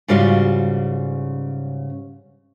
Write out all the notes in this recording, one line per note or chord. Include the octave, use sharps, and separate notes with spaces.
G#2 C#3 G3 F4 F#4